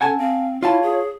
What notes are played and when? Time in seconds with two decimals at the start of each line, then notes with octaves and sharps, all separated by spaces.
0.01 C#4 A4 F#5 G#5 A5
0.18 C4 F5
0.63 E4 F4 C#5 F5 A5
0.83 G#4